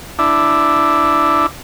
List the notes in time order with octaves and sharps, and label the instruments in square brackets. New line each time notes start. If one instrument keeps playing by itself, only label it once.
[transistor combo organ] D4 E4